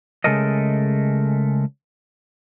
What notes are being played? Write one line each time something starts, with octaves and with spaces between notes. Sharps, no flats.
C#3 G#3 A3 A4 A#4 D#5